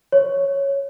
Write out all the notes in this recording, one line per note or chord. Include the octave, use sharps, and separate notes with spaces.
C#5